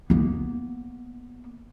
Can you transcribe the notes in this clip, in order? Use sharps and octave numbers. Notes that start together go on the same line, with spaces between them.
A#3 B3